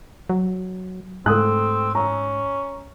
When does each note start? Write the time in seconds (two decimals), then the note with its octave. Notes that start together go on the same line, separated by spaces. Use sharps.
0.30 F#3
1.26 G#2 A3 C4 D#6 F#6
1.95 C#4 A#5